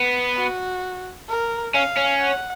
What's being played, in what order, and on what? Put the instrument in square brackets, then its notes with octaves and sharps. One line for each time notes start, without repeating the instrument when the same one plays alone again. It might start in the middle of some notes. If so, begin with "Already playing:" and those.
Already playing: [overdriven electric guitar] B3
[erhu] F#4
A#4
[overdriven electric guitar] C#4 [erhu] F5
[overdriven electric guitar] C#4
[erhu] F#5